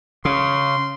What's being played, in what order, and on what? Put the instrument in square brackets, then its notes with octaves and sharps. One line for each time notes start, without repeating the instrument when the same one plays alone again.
[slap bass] C#3 [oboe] C6